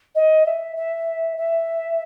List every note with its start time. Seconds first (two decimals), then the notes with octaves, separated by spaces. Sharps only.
0.15 D#5
0.46 E5
0.76 E5
1.37 E5